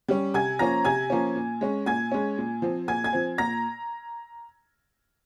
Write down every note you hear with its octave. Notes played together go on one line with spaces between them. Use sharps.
G3 C#4
C3 G#5 G#6
F3 A#3 C#4 A#5 A#6
C3 G#5 G#6
F3 A#3 C#4
A#2
G#3 C#4
A#2 G#5 G#6
G#3 C#4
A#2
F3 C4
A#2 G#5 G#6
G#5 G#6
F3 C4
A#2 A#5 A#6